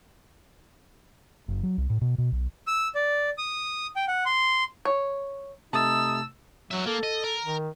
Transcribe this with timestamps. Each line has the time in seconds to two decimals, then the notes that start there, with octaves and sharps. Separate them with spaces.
1.48 F#1
1.63 F#3
1.78 C2
1.90 A2
2.01 B2
2.18 B2
2.32 B1
2.67 E6
2.95 D5
3.38 D#6
3.96 G5
4.08 F#5
4.26 C6
4.85 C#5
5.73 C3 A3 D#4 A5 E6 A6
6.71 F#3 F#4 E5
6.86 A#3 A4
7.03 D#5
7.24 A#4
7.44 D#3